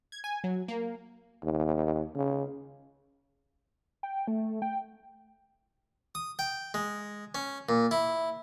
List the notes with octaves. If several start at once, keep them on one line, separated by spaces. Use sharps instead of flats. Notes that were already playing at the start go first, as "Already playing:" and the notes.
G#6
G#5
F#3
A#3
D#2
C#3
G5
A3
G5
D#6
G5
G#3
C#4
A#2
E4